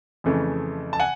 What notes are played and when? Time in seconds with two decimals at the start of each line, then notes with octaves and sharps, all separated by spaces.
0.24 F2 C#3 E3 A3
0.93 A5
0.99 F#5 G#5